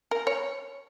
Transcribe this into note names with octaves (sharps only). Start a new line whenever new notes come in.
A#4
C#5